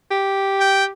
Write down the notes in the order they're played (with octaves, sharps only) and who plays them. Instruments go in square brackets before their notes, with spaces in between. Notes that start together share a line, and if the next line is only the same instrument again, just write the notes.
[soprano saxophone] G4
[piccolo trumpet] G5